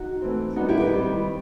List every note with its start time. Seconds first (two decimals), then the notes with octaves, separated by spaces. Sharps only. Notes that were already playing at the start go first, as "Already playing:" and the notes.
Already playing: D#4 F#4
0.22 E3 A3 C4
0.56 D#3 G3 B3 D#4 F#4
0.69 E4 G4
0.80 G4 B4
0.92 D#3 G3 C4